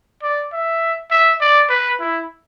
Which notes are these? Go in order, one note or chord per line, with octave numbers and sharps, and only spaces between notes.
D5
E5
E5
D5
B4
E4